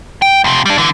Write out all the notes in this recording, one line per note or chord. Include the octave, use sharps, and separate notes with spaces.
G5
F2 C3
G3 D4
D3 E3